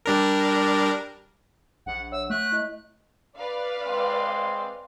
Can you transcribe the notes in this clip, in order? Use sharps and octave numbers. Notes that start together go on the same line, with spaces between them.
G3 D4 A#4
A#1 F#5
C#5 E5 F#5 E6
A3 F#6
E4 D#5
B4 D5 F5
G#3 C4 C6